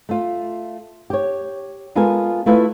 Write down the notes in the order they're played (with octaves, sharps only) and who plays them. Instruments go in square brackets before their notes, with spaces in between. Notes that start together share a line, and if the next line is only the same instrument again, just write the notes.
[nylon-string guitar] A3 F4
G4 C#5
G#3 B3 F4 A4 A#4 G#5
A3 E4 F4 B4 F5